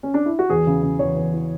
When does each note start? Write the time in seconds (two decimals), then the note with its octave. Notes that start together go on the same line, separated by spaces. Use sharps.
0.03 C#4
0.14 D4
0.26 E4
0.39 F#4
0.50 E2 G#4
0.67 C#3
0.83 C#3
0.99 E2 C#5
1.17 E2
1.33 E3